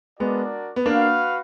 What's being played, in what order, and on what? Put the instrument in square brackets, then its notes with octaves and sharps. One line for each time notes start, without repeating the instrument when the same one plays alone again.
[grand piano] G#3 B3 [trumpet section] D4 F#4 A#4 D5
[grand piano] B3
[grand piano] A#3 D4 [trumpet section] F#4 B4 F5